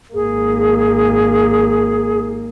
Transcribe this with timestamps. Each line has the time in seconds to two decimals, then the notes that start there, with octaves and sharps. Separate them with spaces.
0.14 G#1 A#3 G#4